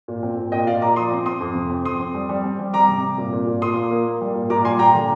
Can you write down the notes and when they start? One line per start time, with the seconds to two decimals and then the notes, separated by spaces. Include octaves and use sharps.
0.08 A#2
0.23 C4
0.38 A#2
0.52 A#2 D#5 G5
0.67 A#2 D5 F5
0.82 A#2 A#5 D6
0.96 F3 C6 D#6
1.12 C4
1.26 C4 C6 D#6
1.40 F2
1.55 C3
1.70 C4
1.85 F2 C6 D#6
2.00 C4
2.15 G3
2.29 G3
2.44 C4
2.59 G3
2.73 G3 A#5 D6
2.88 C3
3.03 C3
3.18 A#2
3.33 A#2
3.47 A#2
3.62 A#2 C6 D#6
3.76 A#3
3.91 A#3
4.06 A#3
4.21 G3
4.35 A#2
4.50 A#2 A#5 D6
4.65 G3 G#5 C6
4.79 A#2 G5 A#5
4.94 D3